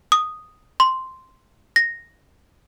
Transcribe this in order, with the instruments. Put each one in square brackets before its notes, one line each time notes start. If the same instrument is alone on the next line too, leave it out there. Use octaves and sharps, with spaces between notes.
[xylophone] D#6
C6
A#6